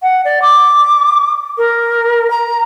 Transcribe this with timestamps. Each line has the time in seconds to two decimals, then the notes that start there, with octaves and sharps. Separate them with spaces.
0.02 F#5
0.25 D5
0.42 D6
1.58 A#4
2.30 A#5